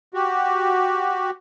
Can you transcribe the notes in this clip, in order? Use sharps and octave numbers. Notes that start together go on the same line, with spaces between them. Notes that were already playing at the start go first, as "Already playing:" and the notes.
F#4 G4